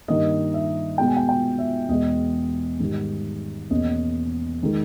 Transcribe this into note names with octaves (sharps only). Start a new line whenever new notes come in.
G2 D#3 A#3 D#5
E5
B2 G#3 B3 G5
G#5
G5
G5
E5
E2 B2 G#3 B3 D#5
G#2 D#3 G3
E2 B2 A#3 C#4 D#5
D#3 G#3